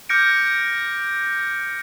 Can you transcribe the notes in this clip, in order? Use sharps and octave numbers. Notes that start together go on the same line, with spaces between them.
D6 F6 G6 A#6 C#7 D7